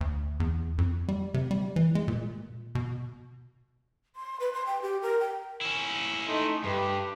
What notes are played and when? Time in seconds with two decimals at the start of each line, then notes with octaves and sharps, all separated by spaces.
0.01 D2
0.40 E2
0.78 F2
1.08 G3
1.34 C3
1.51 G3
1.76 E3
1.95 G#3
2.08 A#2
2.75 B2
4.16 C6
4.40 B4
4.54 C6
4.66 G5
4.82 G4
5.02 A#4
5.20 G5
5.61 C#4 E4
6.26 A3 D#4 C6
6.64 G2 G4 B4